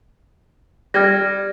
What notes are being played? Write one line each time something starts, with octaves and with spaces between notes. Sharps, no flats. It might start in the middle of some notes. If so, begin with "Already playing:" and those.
G3 F6 G#6 A#6